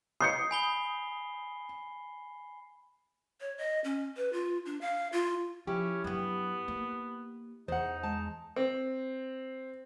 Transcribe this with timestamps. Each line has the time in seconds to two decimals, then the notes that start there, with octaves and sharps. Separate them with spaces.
0.20 D#6 G6 C7 C#7
0.51 G#5 B5 G7
3.41 C#5
3.58 D#5
3.84 C#4
4.17 B4
4.33 F4
4.66 D4
4.81 F5
5.13 F4
5.67 F3 C#4 E4 G4
6.04 F#2 B3 D4
6.68 A#3
7.68 E2 D#4 C5 F#5
8.03 G#3 A5
8.56 C4